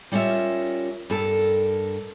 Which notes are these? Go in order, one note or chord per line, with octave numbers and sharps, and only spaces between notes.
G3 C#4 F4 A#4 E5
G2 A4 A#4